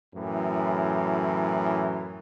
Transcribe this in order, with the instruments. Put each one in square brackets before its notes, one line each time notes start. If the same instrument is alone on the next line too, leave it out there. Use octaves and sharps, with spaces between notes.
[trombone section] F#2 A2 E3